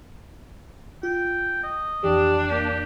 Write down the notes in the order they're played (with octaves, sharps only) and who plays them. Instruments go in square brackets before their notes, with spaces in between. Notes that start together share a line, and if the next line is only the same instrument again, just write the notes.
[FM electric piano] F4 [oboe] G5
[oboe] D#5
[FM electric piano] F2 E3 [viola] D4 [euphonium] G4
[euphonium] A#3 [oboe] G4